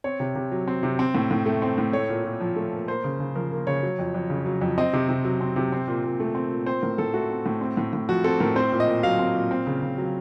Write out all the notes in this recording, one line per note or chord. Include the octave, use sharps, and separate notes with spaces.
C4 C#5
C3
C3
F#3
C4
C3
C4
A2
A2
A3
C4
A2
A3 C#5
A#2
A#2
F3
A3
A#2
A#3 C5
C#3
C#3
F3 A#4
A#3
C#3 C#5
F#3
F2
F2
C#3
F#3
F2
C4 D#5
C3
C3
F#3
C4
C3
C4
A#2
A#2
A3
C4
A#2
C4 C5
A2 A#4
A2 A4
A3 F#4
C4
A2
C4
A2
A2
F3 F#4
C4 A4
A2 A#4
C4 C5
A#2
D#5
A#2
F#3 F5
C4
A#2
C4
C#3
C#3
F#3